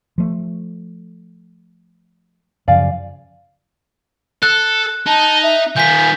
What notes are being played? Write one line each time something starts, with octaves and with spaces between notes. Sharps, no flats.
F3 A3
F#2 C#3 F3 D5 F5 G#5
A4 F#6
D#4 A5
E5
D#3 F4 G#5 G6 B6